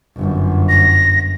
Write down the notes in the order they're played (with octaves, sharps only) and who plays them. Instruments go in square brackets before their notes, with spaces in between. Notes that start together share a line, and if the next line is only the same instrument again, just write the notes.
[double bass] G1 F#2
[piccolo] A#6